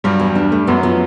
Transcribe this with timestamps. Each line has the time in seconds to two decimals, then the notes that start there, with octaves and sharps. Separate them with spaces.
0.04 G2 F#3 G3
0.20 E2
0.35 D4
0.52 A3
0.67 F#2 F#3 B3
0.83 F3 B3